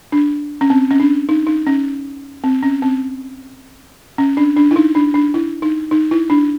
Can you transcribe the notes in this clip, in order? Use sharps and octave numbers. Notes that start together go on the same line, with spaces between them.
D4
C#4
C4
C#4
D4
D#4
D#4
C#4
C4
C#4
C4
C#4
D4
D4
E4
D#4
D4
D4
E4
D#4
D#4
E4
D4